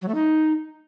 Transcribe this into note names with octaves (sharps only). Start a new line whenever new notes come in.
F#3
A3
D#4